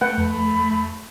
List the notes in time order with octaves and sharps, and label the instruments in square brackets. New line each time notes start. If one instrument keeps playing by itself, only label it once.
[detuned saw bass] A3 [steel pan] B4 F#5 G5
[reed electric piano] F2 [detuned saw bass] A3 [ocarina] B5